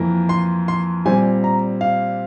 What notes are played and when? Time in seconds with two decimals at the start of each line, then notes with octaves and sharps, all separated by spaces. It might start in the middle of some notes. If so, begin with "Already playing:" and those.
Already playing: F2 E3 A#3
0.29 C6
0.68 C6
1.06 A#2 G3 C4 G#5
1.44 A#5
1.81 F5